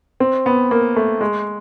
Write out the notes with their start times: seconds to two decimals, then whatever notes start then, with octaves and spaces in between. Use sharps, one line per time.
0.20 C4
0.46 B3
0.71 A#3
0.96 A3
1.21 G#3